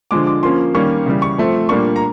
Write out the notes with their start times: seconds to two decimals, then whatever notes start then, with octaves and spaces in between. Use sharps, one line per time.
0.11 D3 F3 G#3 D6
0.27 D6
0.43 F3 A#3 C#4 C6
0.74 D#3 G3 A#3 C#4 C#6
1.06 C#3 E3 G3
1.22 C#6
1.38 F3 A3 C4
1.69 A#2 G3 A#3 D4 C#6
1.96 A#5